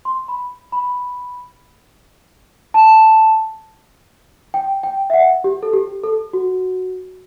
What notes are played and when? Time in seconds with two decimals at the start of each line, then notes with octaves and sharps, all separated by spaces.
0.05 C6
0.28 B5
0.72 B5
2.74 A5
4.54 G5
4.83 G5
5.10 E5
5.13 F#5
5.44 G4
5.63 A4
5.73 G4
6.04 A4
6.33 F#4